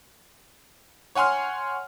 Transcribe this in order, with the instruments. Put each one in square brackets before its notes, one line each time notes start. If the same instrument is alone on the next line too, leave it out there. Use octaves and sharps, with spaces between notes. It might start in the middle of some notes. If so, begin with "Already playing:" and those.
[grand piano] C#5 F#5 G#5 C6 F6